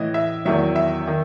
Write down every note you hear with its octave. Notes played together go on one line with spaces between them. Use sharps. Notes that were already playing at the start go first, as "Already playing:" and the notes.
Already playing: A2 E3 D#5
E5
E2 D#3 F#3 E5
E5
D#3